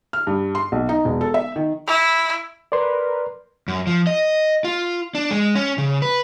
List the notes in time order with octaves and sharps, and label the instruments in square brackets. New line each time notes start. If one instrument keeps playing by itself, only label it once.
[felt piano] F6
G2
C6
B1
D#4
E1
A4
E5
D#3
[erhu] E4
[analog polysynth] A#4 B4 [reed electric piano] D5 C6
[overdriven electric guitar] F#2
F3
D#5
F4
D4
G#3
C#4
C#3
B4